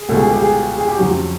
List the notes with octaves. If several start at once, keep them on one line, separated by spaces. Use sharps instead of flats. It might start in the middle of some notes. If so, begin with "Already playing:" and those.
Already playing: G#4
C#2 B2 G3 A4
G#4
G4
G#4
G#4
G4
F2 C#3 F#3 F#4